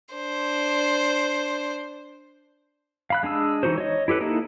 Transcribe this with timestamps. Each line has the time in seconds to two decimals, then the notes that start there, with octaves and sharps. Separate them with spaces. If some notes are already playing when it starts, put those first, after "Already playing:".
0.15 D4 C5
3.10 F5 B5 F#6
3.23 G#3 D4 G#4 E6
3.63 E3 D#4 F#4 G#4 C5
3.78 C#5 D#5
4.08 E4 G4 A4 B4
4.21 A#3 D#4 E4 A4